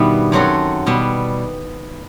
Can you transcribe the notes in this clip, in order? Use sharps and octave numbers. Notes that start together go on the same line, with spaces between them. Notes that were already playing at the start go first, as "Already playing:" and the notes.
Already playing: G2 B2 D#3 G3 B3 E4
F#2 F#3 C4 F#4 A4
B2 G3 B3